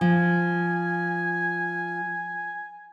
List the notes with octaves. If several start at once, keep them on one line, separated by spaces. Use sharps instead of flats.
F3 G#5